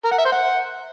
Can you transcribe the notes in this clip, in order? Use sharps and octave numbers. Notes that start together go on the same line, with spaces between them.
A#4
F#5
E5
C5
F#5